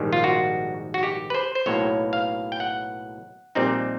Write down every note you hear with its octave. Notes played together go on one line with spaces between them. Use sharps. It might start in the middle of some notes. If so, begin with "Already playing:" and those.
Already playing: A#1 G#2 D#3 G3
F4
F#4
F#4
G4
B4
C5
C5
B1 A2 F#3 A#3 C#5
F5
G5
F#5
A#1 A#2 G3 C4 D#4